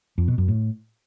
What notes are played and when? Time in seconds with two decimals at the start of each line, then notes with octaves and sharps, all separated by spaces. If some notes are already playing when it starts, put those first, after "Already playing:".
0.18 F2
0.28 B2
0.38 F#2
0.48 A2